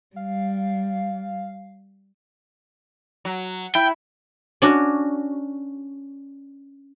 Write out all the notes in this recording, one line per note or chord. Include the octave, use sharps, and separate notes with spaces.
G3 F5
F#3
E4 G5
C#4 D4 F#4